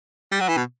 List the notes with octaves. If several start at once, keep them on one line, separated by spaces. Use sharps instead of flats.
G3
F#3
E3
B2